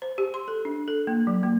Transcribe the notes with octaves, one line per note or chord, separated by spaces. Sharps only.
C5
G4
C6
A4
D4
A4
A#3
F#3
A#3